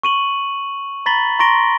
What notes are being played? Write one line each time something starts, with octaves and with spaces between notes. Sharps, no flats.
C#6 D#7 F#7
A#5 B5 A6 B6 F#7 G7
A#5 C6 C#6 A#6 D7 G7